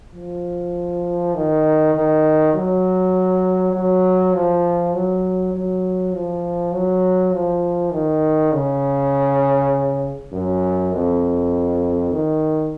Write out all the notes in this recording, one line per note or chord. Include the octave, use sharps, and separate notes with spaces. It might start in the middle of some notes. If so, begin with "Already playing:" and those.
F3
D#3
D#3
F#3
F#3
F3
F#3
F#3
F3
F#3
F3
D#3
C#3
F#2
F2
D#3